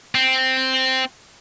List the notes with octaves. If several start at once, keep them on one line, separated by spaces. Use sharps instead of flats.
C4